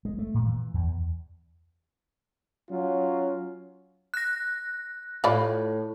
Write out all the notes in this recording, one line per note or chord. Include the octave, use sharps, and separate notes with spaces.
G#3
A3
A#2
E3
E2
F#3 C#4 F4
F#6 A#6
A2 F4 D5 B5